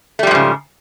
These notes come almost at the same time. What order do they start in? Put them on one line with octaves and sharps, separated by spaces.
A3 G3 F3 G#2 C#3